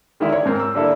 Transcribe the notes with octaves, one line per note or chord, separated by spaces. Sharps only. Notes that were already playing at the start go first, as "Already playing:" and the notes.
D3 D#3 G#3 D4 E4
C#5
G#2 C4 A#4
E6
D3 G3 A#3 D4 E4 A4